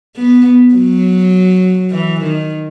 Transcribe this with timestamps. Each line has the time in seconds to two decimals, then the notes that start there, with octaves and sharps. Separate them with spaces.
0.16 B3
0.75 F#3
1.91 E3
2.20 D#3